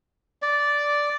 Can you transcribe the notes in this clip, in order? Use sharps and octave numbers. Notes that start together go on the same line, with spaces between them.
D5